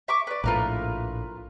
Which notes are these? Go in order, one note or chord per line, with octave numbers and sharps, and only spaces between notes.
E5 C#6 D6
B4 D5
A#1 A2 A3 F4 A#4 B4